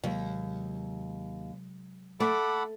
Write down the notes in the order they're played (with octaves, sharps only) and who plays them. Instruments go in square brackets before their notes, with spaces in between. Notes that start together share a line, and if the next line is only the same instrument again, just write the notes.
[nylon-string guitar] D#2 [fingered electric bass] C3 F#3 G#3
[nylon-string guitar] A3 [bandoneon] A4 F#5 B5 [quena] D6